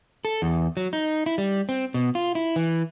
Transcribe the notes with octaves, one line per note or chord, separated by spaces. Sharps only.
A4
E2
F#3
D#4
E4
G3
C4
B2
F4
E4
E3